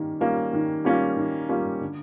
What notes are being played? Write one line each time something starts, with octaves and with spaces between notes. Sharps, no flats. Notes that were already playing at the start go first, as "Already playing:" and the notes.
Already playing: D#3 G3 A#3 C#4
G3 A#3 C#4 F4
D#3
G3 A#3 C#4 F4
D#3
G3 A#3 C#4 F4
D3